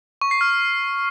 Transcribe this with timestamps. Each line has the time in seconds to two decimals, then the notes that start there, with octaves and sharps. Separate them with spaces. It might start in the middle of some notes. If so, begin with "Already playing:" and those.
0.21 C#6
0.31 C7
0.41 F6